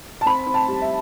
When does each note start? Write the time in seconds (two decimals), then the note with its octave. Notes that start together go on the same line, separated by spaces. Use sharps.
0.21 A5
0.26 C4 B5
0.47 C4
0.54 A5
0.68 G3
0.82 E5